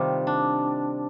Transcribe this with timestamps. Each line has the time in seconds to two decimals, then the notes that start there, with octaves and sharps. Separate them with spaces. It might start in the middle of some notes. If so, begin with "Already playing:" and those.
Already playing: C3 D#3 G3 F4
0.27 D4